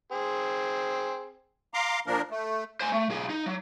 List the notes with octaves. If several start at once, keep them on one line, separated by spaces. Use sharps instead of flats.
C4 G#4
F5 A#5 C6 D6
A#2 F3 A#3 D4 A#4
A3
C5 G#5
A3
B1 G#4
D#4
F#3